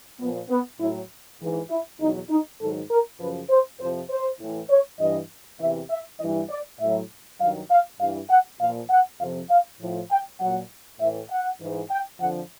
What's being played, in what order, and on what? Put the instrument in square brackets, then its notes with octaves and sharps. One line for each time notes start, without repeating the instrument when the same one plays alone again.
[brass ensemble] A#2 F3 B3
B3
A2 F#3 E4
G#2 E3
E4
E2 B2 F#3 D#4
D#4
G#2 D#3 F#3 A4
A#4
F#2 C#3 F3 B4
C5
F2 C3 F3 C5
C5
A2 E3
C#5
G2 E3 D#5
E2 C3 E3 E5
E5
G2 E3 D#5
D5
A2 F#3 E5
G2 D#3 F#3 F5
F5
G2 E3 F5
F#5
A#2 F3 F5
F#5
F2 C3 F3 F5
F5
A2 F3
G5
A#2 F#3 F#5
A2 E3 E5
F#5
G#2 E3
G5
F2 D3 F3 F#5